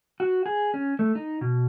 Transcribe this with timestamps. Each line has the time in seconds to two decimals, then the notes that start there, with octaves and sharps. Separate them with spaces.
0.20 F#4
0.46 G#4
0.74 C#4
0.99 A3
1.15 D#4
1.41 B2